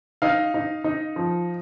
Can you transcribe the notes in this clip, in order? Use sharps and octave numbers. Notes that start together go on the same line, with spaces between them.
D#4 F5
D#4
D#4
F3